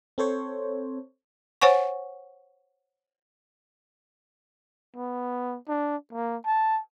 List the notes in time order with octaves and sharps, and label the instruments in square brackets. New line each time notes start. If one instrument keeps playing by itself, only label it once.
[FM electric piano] C4 A4 C5 C#5
[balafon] C5 C#5 F#5 G#5 C#6
[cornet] B3
D4
A#3
A5